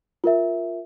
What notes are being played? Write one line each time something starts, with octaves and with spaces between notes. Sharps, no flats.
F4 A#4 E5